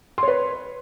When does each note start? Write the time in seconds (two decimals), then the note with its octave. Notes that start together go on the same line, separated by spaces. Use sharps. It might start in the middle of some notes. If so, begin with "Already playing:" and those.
0.18 C6
0.23 C#5
0.28 B4